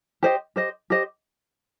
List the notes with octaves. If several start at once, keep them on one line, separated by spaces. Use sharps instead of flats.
G4 C5 D#5
G4 C5 D#5
G4 C5 D#5